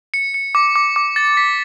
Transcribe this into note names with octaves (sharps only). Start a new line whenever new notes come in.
C#7
C#7
D6
D6
D6
A6
B6